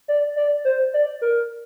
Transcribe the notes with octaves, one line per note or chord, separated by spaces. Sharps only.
D5
D5
C5
D5
A#4